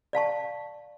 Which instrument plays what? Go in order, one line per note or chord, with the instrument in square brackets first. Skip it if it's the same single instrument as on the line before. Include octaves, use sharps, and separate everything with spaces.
[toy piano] D5 F5 A5 C#6